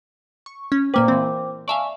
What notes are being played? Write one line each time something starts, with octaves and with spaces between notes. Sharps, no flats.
C#6
C#4
A#2 A#3 B4 C5 G5 D6
A#2 E3 C4
D5 E5 F5 G#5 A5 C#6